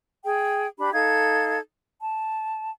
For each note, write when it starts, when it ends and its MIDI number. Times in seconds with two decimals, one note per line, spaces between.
0.24 0.67 68
0.24 0.67 79
0.79 0.92 62
0.79 0.92 67
0.79 0.92 83
0.93 1.59 63
0.93 1.59 69
0.93 1.59 77
0.93 1.59 92
2.01 2.71 81